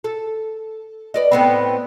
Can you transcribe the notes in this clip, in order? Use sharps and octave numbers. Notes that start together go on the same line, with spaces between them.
A4
B4 D5 D#5
A2 B3 C4